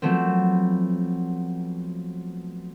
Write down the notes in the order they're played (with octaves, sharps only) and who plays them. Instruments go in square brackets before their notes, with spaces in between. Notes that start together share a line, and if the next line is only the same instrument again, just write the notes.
[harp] F3 F#3 A3 B3 C4